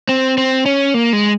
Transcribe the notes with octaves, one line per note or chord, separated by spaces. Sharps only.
C4
C4
C#4
A#3
G#3